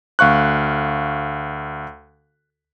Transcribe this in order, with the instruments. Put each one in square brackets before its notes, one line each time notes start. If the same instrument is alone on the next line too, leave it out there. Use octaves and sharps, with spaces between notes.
[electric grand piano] D2 F5 C#6 F#6